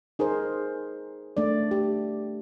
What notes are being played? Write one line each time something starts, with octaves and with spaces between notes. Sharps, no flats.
D#4 G#4 A#4 C5
A3 D4 D5
G4